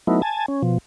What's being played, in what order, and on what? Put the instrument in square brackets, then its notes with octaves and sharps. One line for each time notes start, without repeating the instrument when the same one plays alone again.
[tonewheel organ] F#3 A3 B3 D#4 E4
G#5 A5
C#4
B2 F3